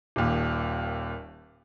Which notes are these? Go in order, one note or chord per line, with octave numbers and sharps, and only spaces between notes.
D#1 D#2